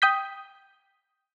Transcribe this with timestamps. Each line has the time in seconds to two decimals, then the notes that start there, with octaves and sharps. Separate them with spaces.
0.02 G5 D#6 G6 B6